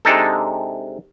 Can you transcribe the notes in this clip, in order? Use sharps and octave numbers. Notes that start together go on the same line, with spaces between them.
C3 G#3 D4 D#4 A4